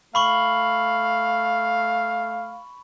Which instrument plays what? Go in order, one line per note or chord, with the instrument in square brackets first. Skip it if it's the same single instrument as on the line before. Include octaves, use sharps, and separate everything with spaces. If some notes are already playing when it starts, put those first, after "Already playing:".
[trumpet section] A3 F5 [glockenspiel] B5 C#6 F#7